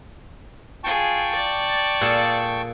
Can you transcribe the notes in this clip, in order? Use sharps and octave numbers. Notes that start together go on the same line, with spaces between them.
F4 G#4 G5 A5 C#6
D5
A#2 G#4 A4